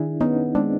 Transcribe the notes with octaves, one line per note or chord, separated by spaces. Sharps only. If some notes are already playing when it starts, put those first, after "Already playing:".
Already playing: D#3 D4 E4 G#4
B3 C#4 D#4
G#3 C4 D4